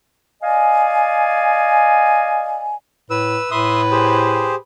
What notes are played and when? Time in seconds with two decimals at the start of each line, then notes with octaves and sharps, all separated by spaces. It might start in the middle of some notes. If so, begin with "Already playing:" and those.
0.43 D5 D#5 F5 G#5
3.10 A2 B4 E6
3.51 A2 B4 E5 C6 D#6
3.91 G4 G#4 C5